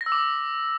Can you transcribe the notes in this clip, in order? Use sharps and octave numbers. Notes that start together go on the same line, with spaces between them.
A#6
E6
D6